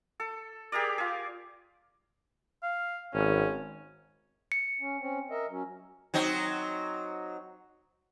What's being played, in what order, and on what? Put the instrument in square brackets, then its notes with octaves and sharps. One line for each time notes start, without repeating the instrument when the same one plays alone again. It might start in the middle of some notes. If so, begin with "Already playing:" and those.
[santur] A4
G4 G#4 A#4 D5
F4 G#4
[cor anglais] F5
[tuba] G#1 [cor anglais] C#4
[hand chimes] C#7
[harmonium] C#4
C4 C#4
A#4 D#5 E5
F#3 C#4
[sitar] F#3 C4 D#4